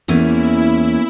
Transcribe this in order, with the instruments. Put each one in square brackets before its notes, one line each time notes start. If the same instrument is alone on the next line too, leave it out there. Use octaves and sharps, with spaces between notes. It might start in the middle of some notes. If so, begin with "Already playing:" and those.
[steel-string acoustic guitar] E2 E3 A#3 C#4 [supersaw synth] E4